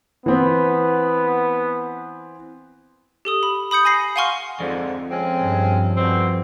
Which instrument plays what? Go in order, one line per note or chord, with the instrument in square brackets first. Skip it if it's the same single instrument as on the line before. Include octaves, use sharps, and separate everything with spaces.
[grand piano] E3 C4 [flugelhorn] B3
[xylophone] G4 A4 D#6
B5
B5 D#6 G6 C#7
G#5 B5 A#6 C7
F5 F#5 G#5 C6 C#6 F6
[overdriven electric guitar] F2 [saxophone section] G#2 D3
[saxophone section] G#3 C4 C#4
[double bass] G2
[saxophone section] B2 D3 C4